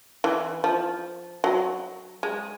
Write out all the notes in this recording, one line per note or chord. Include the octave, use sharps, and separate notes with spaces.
E3
F3
F#3
G#3